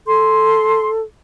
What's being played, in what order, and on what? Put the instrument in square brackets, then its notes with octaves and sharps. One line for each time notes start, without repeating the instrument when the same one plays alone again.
[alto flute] A4 [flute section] C6